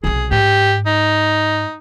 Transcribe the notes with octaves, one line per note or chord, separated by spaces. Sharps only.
B1 C3 G#4
G#2 G4
D#4